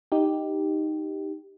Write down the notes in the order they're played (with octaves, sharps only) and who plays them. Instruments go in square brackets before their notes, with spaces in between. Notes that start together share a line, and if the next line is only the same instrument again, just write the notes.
[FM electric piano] D#4 G4